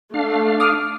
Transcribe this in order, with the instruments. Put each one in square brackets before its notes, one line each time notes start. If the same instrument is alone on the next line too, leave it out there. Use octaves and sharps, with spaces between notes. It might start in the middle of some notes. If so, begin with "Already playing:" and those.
[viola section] A3 [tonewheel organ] D4 F5
[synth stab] D6 D#6 F6